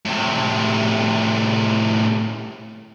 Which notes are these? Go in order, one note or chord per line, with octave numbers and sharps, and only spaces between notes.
A2 C3